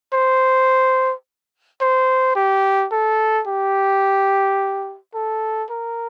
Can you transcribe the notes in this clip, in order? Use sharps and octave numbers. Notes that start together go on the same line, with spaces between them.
C5
C5
G4
A4
G4
A4
A#4